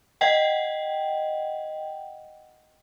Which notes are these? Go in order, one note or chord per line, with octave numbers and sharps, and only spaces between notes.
D#5 F#5 G5